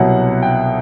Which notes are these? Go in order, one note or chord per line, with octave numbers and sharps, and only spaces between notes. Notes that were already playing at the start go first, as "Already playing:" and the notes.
Already playing: C2 B2 F#3 F#5
G5